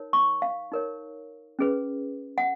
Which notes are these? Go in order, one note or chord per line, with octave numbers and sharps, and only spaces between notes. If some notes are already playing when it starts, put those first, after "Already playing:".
Already playing: D#4 A#4 C#5
C#6
F5
D#4 A#4 C#5
C#4 G#4 B4
F#5